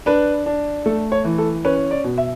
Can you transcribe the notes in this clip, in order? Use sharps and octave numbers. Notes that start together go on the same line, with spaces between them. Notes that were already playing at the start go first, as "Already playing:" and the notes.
D4 B4
D4
A3 A4
C#5
E3
A4
C#4 B4
D5
B2
E5